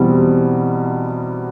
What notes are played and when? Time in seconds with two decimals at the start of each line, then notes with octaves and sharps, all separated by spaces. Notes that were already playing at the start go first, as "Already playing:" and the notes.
Already playing: E2 B2 G3 C4